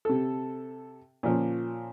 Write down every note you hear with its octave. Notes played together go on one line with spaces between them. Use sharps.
C3 A4
A#2 F3 C#4